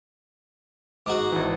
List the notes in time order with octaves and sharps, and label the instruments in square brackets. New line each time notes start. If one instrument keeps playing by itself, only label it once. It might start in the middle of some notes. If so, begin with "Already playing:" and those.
[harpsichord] G#2 D#4 F#4 [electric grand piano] D6
[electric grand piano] G#1 E3